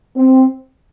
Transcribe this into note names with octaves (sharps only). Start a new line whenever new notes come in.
C4